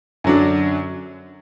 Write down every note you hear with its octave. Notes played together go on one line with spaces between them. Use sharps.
F#2 D3 F#3 D4